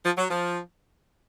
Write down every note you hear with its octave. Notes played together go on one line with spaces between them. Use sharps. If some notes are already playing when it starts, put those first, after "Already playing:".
F3
F#3
F3